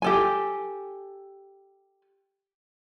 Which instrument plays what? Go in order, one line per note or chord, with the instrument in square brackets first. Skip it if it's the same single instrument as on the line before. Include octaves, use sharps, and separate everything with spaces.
[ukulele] G4 A4 G#5